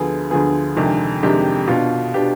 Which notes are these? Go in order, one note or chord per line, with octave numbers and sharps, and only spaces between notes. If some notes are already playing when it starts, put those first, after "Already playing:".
Already playing: D2 D3 F3 B3 G#4
D2 D3 F3 B3 G#4
F2 C3 D#3 G#3 D4
F2 C3 D#3 G#3 D4 G4
B2 B3 D4 F4
B2 B3 D4 G4